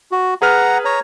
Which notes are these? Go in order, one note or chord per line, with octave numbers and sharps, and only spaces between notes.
F#4
G#4 B4 F#5 A#5 F6
C#5 A#5